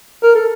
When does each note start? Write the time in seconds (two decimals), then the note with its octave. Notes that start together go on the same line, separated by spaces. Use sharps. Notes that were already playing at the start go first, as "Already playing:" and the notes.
0.23 A#4
0.35 A4